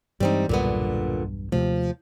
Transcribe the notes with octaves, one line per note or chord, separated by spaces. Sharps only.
G2 E3 G3 G#3 C4 D#4
B1 E2 G2 A#2 D3 B3
D#2 C3 F3 A3